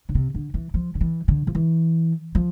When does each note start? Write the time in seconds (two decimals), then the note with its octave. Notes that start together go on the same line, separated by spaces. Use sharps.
0.09 D3
0.15 C3
0.34 D3
0.54 E3
0.74 F3
0.95 D3
1.01 E3
1.28 D3
1.47 F3
1.55 E3
2.35 F3